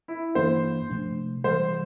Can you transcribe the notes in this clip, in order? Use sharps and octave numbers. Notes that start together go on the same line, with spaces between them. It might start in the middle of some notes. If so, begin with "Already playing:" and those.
E4
G2 E3 A#3 D4 C5
C3 F3 A3 D4
C3 E3 G3 C5